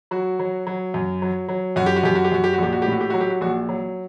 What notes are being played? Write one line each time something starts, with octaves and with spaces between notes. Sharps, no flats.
F#3 F#4
F#3
F#3
F#2
F#3
F#3
F#2 F#4
G4
F#4
F#2 G4
F#4
G4
F#2 F#4
G4
F#4
A#1 G4
F#4
A2 G4
F#4
G4
F#3 F#4
G4
F#4
A#1 F#4
F#3